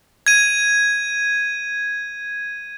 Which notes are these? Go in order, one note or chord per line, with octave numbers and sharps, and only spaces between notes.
G#6 D#7